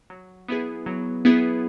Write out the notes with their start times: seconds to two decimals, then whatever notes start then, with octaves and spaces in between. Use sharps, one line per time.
0.10 F#3
0.48 B3 E4 G#4
0.86 F#3
1.25 B3 E4 G#4